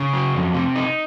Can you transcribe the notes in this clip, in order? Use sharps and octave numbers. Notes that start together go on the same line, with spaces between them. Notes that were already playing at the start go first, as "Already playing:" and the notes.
Already playing: C#3
F#3
F2
C3
D#4